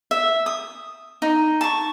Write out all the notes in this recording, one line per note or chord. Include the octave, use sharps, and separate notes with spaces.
E5
D#6
D#4
A5 C#6